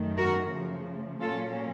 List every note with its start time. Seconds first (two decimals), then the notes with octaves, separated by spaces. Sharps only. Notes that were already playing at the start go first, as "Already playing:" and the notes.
Already playing: F#2 D#3 A3
0.17 F#4 A#4
0.52 C#3 F3 A3
1.21 A#2 F#3 A#3 C#4 F4 A4